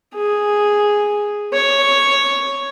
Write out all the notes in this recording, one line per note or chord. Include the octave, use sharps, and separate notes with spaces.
G#4
C#5